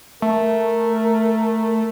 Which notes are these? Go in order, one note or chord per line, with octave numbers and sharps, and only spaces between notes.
A3 A#4